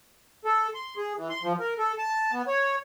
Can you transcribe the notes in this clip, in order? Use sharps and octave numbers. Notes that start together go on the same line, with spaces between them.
A4
C6
G#4
E3
C6
F3
A#4
A4
A5
B3
C#5